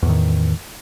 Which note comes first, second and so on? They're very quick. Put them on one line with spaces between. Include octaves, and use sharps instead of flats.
E2 A2 D#3